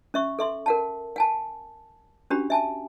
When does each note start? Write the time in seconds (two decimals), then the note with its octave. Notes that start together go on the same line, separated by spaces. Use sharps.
0.14 C#4 E5 C#6
0.39 A4 E5 C6
0.66 A#4 F#5 A5
1.16 F#5 G#5 A5
2.30 C#4 D4 F#4 G4 B5
2.50 E5 G#5 A5